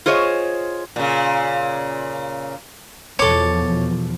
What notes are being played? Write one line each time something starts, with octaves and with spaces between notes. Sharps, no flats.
F4 G#4 C5 C#5 D#5
A#2 C#3
E2 B2 F3 A4 C#5 D6